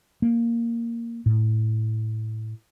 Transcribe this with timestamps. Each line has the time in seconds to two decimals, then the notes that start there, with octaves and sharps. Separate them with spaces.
0.22 A#3
1.26 A2